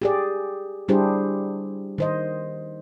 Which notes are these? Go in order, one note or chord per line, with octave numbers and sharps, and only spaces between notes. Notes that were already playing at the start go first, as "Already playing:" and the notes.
G4 G#4 D5
G3 D4 E4 G4 G#4 C5
D#3 C5 D#5